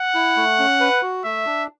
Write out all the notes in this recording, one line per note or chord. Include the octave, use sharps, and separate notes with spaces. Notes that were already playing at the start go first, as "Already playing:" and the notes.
Already playing: F#5
E4
A3
C#4
B4
F#4
A3 E5
D4